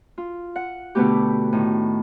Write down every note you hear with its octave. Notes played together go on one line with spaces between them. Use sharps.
F4
F#5
B2 D3 A3 B3 G4
A2 D#3